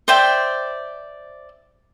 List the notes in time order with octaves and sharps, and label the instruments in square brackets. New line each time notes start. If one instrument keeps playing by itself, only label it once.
[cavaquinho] C5 D5 E5 G5